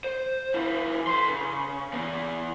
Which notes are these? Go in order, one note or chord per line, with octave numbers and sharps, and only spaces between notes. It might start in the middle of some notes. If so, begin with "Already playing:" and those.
C5
F3 E4
B4 C6
C#3
E3 B3